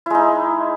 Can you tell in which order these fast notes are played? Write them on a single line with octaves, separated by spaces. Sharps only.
E4 G#3 D#4